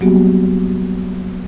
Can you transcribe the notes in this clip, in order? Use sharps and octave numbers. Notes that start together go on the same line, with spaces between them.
F#3 G3 A#3 B3 F#4 G4